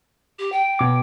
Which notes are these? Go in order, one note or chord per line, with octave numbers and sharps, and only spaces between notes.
G4
G5
B2 D6